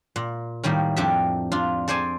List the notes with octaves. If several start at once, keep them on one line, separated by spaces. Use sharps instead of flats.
A#2
A2 D#3 G3 A#3
F2 D4 G4 E5
D4 F4
A4 C5 D5 G#5 A5